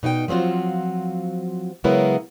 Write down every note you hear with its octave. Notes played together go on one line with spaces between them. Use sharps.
B2 D#4 D5 G5
F3 F#3 C4 F4 F#4
C#3 F#3 G#3 B3 E4 A#4